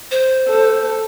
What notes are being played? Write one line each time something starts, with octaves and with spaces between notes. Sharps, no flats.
C5
A4